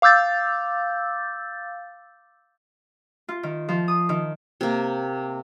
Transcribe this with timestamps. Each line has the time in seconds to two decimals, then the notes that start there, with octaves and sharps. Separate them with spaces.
0.02 F5 D6 E6 G6 A6
3.29 F4
3.43 D#3
3.69 F3
3.88 D#6
4.09 D#3
4.61 C3 A#3